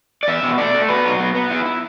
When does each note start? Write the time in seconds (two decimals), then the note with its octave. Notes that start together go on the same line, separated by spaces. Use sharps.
0.23 D5
0.28 E2 E5
0.43 B2
0.58 A3 D5
0.74 A3
0.89 B2 B4
1.05 F#3
1.20 B3
1.35 B3
1.51 E4
1.66 E4